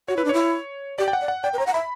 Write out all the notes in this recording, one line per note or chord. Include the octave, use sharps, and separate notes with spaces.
F#4 C#5
E4 B4
D4
E4 C#5
G4 D5
G5
F#5
D5
F#5
D5 G5
B4
C#5 A#5
F#5
E5 B5